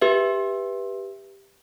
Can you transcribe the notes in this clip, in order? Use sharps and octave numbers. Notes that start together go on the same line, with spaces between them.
G4 B4 E5